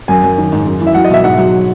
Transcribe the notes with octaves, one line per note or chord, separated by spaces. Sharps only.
F#2 G#5
F#2
D#3
G#2
F#2
E3
E5
F#3 F#5
D#5
B2 E5
G#2 F#5
F#3